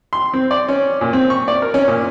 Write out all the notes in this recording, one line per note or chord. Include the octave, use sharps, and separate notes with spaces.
C6
C4
D5
C#4
A#2
C4
C#6
D5
A#4
C#4
A#2